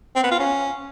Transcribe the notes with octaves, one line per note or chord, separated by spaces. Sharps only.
C4
B3
F4
C#4